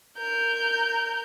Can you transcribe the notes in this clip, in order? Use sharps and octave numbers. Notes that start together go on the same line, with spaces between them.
A#4 G6